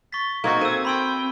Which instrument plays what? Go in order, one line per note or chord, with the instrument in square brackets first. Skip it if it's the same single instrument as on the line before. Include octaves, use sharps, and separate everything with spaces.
[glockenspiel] C#6 B6 [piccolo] A6
[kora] A#3 C4 F#4 [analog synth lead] D#4 [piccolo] G#6
[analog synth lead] C4 [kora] A4 [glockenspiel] E6 D#7
[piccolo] G5 [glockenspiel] B5 C6 E6